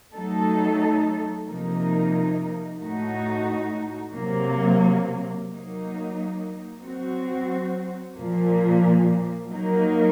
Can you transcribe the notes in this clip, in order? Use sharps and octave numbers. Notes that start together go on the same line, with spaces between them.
F#3 A3 D#4 A4
C3 F3 A#3 D#4 A#4
A2 A3 D#4 F#4
C3 F#3 A#3
F#3 A#3 D#4
F#3 C4 F#4
A#2 F3 A#3
F#3 A#3 D#4 A#4